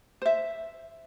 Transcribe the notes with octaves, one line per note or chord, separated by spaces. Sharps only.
C5 E5